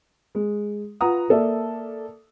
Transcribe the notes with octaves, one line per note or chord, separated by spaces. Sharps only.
G#3
F4 B4 F#5 A#5 D#6
A#3 A4 D5 E5